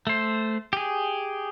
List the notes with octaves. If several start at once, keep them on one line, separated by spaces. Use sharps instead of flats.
A3 C5
G4 G#4